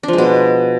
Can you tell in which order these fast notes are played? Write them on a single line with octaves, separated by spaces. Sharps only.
D4 F3 G#3 B2